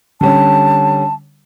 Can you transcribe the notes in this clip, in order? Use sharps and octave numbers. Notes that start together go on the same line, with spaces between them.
D3 G3 C#4 A5